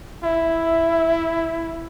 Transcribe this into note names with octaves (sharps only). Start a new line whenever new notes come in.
E4 E5